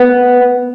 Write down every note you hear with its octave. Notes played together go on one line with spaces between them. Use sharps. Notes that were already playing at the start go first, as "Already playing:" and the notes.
Already playing: B3